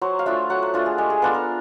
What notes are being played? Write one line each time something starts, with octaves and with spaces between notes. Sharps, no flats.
F#3 C5
F5
A3 D4 F4 E5
F#3 F#5
C5
A3 D4 F4
G#4
G#3 G4
G#4
B3 D4 F4 A4
A#4